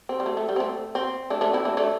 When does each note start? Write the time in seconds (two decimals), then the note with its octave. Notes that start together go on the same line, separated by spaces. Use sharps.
0.09 C4
0.20 G3
0.26 A3
0.37 A3
0.49 G3
0.56 C4
0.60 A3
0.95 C4
1.30 A3 D4
1.41 A3 D4
1.53 C4 E4
1.65 A3 D4
1.77 A3 D4